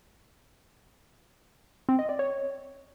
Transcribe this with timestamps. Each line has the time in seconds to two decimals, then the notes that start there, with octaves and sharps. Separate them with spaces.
1.89 C4
1.99 D#5
2.09 D5
2.19 C#5